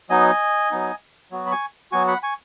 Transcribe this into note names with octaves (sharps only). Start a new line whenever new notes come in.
F#3 B3 D#4 D#5 G#5
F#3 B3 D#4
F#3 B3 F#4
B5
G#5 C#6
F#3 B3 F#4 G#5 C#6
F#5 B5
G#5 C#6